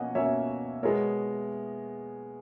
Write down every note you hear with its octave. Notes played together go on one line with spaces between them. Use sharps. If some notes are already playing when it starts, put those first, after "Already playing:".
Already playing: B2 A#3 C#4 D#5 F#5
B2 A#3 C#4 C#5 E5
B2 G#3 B3 A#4 C#5